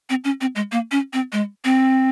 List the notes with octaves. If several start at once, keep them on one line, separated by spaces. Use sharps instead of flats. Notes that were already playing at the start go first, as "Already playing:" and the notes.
C4
C#4
C4
G#3
A#3
C#4
C4
G#3
C4